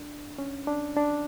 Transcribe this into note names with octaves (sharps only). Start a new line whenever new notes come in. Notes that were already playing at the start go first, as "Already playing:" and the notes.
Already playing: D4
C#4
D4
D4